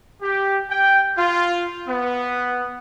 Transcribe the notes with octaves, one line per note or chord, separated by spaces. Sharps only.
G4
G5
F4
B3